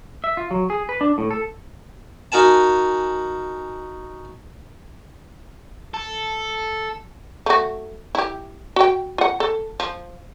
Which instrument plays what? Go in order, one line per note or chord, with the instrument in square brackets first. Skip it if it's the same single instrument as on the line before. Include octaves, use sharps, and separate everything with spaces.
[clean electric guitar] E5
F4
F#3
G#4
B4
D4
A2
A4
[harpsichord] D#4 F#4 A#4 G#5 A5
[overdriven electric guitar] A4
[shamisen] A3 F#4
E4 G4
F#4 G5
F4 F#5
A4
F3